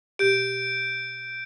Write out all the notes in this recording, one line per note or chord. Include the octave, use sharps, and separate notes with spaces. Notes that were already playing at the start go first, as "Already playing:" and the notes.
B2 G4 G6 D7